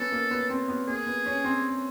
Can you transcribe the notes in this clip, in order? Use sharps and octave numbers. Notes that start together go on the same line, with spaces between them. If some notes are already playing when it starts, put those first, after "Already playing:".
Already playing: B3 C#4 A4
A#3
B3
C4
B3
A#3 G#4
B3
C#4
C4